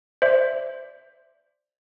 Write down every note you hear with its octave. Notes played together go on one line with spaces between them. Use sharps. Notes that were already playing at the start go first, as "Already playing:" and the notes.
C5 D5 E5